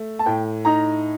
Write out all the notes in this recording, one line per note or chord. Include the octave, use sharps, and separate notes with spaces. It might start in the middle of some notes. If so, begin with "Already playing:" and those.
Already playing: A3
A5
A2 G5
D#4 A#5